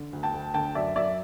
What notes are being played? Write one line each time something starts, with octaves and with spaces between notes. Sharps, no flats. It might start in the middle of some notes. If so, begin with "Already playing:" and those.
Already playing: D3
D2
G5 A5
D2
D3 G5 A5
F#2 D5 E5
F#2 D5 E5